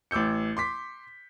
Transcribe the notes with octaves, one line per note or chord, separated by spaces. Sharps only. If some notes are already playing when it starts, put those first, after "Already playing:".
A1 D6 E6 G6 C#7
C6 D6 B6